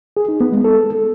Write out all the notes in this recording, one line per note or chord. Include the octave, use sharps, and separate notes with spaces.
G#4
D#4
B3
G#3
A4